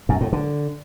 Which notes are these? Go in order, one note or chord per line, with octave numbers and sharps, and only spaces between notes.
F#2
A2
D3